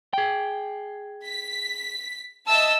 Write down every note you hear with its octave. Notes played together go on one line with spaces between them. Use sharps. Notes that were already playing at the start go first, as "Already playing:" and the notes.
G#4 G5
B6
D#5 E5 A5 E6